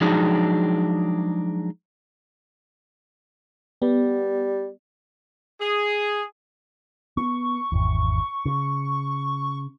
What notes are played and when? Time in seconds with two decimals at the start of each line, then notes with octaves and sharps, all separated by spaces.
0.01 F3 F#3 G#3 D4 D#4 G#4
3.82 G3 B3
5.60 G#4
7.17 B3 C#6
7.72 G#1 E2
8.46 C#3